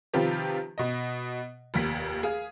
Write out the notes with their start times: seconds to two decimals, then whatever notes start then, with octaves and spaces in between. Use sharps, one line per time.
0.13 C3 D#3 F3 F4 G4 B4
0.78 B2 D#5
1.74 F1 D#2 B6
2.23 G#4 F5